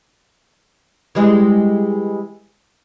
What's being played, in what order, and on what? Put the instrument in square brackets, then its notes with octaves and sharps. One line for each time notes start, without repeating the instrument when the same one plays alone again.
[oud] E3 G3 G#3